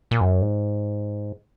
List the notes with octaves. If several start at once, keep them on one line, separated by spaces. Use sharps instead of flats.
A#2
F#2
G#2